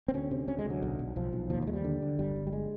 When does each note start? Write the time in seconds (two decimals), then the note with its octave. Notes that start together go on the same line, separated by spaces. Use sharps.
0.08 C4
0.14 D2 C#4
0.31 C3
0.48 D2 C#4
0.59 G#3
0.65 D2 F#3
0.82 B1
0.99 B1
1.16 B1 F3
1.33 B1
1.50 D#2 F3
1.62 F#3
1.67 D#2 G#3
1.73 G3
1.84 D3
2.02 D3
2.19 G1 G3
2.36 G1
2.47 G3
2.53 G#3